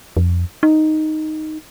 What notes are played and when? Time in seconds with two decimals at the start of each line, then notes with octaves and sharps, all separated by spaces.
0.17 F2
0.63 D#4